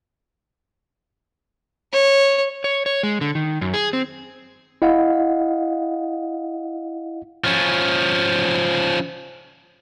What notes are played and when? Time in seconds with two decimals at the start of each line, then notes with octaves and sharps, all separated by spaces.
1.93 C#5
2.64 C#5
2.86 C#5
3.03 G#3
3.21 D3
3.35 D#3
3.61 F#2
3.74 G#4
3.93 C4
4.82 E4 D#5 F5 F#5
7.44 F3 C#4